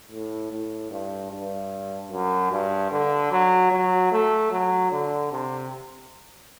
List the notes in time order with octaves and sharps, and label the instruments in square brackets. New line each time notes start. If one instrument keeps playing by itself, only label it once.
[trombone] A2
A2
G2
G2
F#2
G2
D3
F#3
F#3
A3
F#3
D3
C3